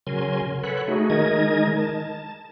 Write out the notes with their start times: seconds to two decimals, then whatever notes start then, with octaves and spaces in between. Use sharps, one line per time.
0.07 C#3 F#3 A#4 G#5 C6
0.64 A4 B4 C#5 F#5 B5
0.88 A3 D#4 F#4 G#4
1.10 D#3 G#3 D#4 A#4 D#5 G#6
1.77 A5